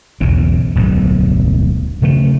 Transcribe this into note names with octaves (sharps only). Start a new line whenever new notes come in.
B1 E2 G#2 C#3
D1 B1 G2
C#3 F3 A3